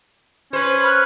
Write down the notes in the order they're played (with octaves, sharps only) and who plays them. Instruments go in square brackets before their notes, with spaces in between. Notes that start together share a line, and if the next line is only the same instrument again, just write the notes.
[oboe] C#4 [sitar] B4 C5
[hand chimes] B5 F6 F#6